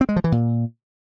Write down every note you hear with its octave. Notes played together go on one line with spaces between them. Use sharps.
C4
G#3
F3
E3
A#2